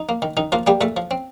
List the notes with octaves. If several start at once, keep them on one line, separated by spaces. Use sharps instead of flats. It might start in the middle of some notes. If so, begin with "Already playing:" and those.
Already playing: D#4
A#3
D#3
D#3 D#4
F3 A#3 F4
G3 A#3 G4
A#2 A3 A4
F3
C4